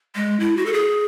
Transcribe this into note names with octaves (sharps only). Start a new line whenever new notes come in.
G#3
E4
F#4
A4
G#4